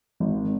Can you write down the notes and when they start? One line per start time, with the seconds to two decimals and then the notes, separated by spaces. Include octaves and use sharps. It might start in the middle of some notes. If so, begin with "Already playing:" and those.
0.20 G#1